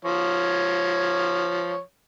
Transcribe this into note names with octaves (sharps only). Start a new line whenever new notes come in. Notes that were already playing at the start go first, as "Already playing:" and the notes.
F3 C#5